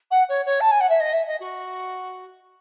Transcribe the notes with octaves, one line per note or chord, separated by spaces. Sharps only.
F#5
C#5
C#5
A5
G#5
F#5
E5
D#5
E5
D#5
F#4